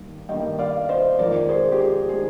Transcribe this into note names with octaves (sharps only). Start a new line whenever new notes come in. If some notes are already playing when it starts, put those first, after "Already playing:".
Already playing: G2 D#3 A#3
G2 D#3 A#3 D#5 G5
D5 F5
C5 D#5
F2 D#3 G#3 A#4 D5
G#4 C5
G4
G#4
D#3 G#3 G#4